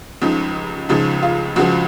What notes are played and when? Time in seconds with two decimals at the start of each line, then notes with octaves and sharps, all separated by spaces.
0.22 C#2 C#3 F3 D#4
0.89 C#2 C#3 F3 D#4
1.22 F4
1.56 C#2 C#3 F3 F#4